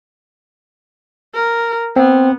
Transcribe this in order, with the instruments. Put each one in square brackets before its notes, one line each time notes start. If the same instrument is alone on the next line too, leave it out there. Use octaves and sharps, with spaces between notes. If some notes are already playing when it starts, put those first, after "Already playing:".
[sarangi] A#4
[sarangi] B3 [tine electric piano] C4